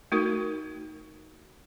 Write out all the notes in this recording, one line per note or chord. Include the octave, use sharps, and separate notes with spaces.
A3 D#4 F#4 A#4